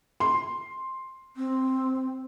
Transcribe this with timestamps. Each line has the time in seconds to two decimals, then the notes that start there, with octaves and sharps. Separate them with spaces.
0.20 C6
1.36 C4